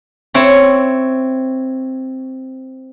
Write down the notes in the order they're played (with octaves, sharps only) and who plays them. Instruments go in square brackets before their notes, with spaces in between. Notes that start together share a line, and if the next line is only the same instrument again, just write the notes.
[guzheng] C4 E4 C#5